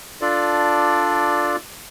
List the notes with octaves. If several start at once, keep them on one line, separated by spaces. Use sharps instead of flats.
D4 F4 A4 D5